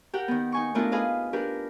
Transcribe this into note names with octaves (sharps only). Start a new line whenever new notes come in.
G4 A#4 F#5 G5
D#3 B3
D#4 G#5 C#6
A3 B3 D4 E4 F4 A#4
G#4 B4 D#5 F5
D4 G4 A#4 B4